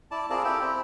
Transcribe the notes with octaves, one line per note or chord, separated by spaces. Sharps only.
E4 D5 A5
C4 F4 G#4 A#4 D5 A5
E4 G4 A4 G5
C4 E4